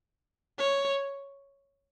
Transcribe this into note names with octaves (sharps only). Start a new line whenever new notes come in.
C#5